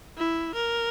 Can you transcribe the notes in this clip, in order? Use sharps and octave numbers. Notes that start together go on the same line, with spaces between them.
E4
A#4